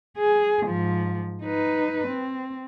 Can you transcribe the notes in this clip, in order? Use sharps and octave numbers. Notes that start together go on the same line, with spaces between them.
G#4
G#2 F3
D#4 B4
C4